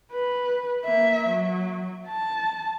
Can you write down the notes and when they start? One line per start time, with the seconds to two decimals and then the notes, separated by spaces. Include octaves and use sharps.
0.13 B4
0.84 A#3 E5
1.29 F#3
2.08 A5